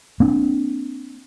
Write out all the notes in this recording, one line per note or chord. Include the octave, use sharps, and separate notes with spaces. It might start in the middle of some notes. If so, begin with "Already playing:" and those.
A#3 C4 D4